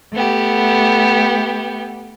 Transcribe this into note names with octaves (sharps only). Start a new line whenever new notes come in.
A3 B3 G4